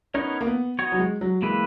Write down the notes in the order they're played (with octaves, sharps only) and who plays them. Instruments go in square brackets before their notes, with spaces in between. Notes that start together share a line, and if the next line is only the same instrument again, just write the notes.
[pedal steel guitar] B3 D#4 A#4 C#5 [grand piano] C#4
[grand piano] A#3
B3
[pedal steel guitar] B3 D#4 F#4 C#5
[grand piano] F#3
G#3
F#3
[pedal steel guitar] E3 A#3 E4 B4 [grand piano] G#3